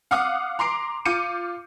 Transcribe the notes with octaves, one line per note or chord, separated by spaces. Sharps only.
F5 F#5 D6 D#6 F6 F#6
A#5 C6 D6 C7 D7
F4 D6 G6 C#7 D#7